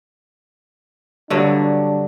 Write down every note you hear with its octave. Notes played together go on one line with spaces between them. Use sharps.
G2 D3 F#3 D4